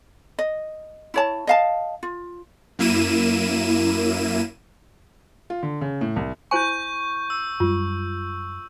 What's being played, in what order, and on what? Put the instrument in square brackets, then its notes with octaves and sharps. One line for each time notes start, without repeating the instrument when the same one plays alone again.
[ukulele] D#5
E4 C#5 A5
D#5 F5 A5
F4
[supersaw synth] F#2 A#3 E4 D#7 E7
[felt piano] F4
D3
C#3
A2
C2
[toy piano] E4 C5 G#5 [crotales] C#6 G6
[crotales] E6
[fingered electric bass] F#2 G3 [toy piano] F4